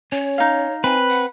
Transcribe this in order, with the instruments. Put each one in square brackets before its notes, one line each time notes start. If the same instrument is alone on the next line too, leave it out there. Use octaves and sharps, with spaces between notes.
[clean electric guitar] C#4 [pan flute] C#5
[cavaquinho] D#4 F5
[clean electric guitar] C4 [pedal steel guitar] B4 [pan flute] G#5
[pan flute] F#5